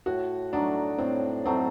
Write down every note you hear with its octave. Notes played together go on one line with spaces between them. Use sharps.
A2 F#4
F#3 A3 D4 D#4
A2 C4
F#3 A3 C4 D#4